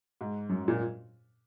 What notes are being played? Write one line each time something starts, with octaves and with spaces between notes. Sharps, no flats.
G#2
F#2
A#2